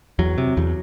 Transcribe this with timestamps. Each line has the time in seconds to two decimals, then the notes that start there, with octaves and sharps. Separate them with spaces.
0.19 E2 F#3
0.38 C3
0.57 E2